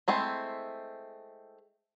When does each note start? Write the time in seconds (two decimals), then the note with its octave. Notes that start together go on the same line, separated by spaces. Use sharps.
0.08 G#3 A3 C4 E4